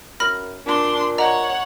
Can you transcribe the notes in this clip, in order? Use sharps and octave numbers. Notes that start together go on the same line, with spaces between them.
F#2 B5 F6 A#6
A#2 D4 C6
C#5 D#5 F#5 A#5